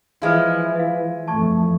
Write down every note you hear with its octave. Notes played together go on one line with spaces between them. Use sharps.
E3 F3 G#3 E4 F5 F6
E5 F5
F2 E3 A3 A5 C#6 G#6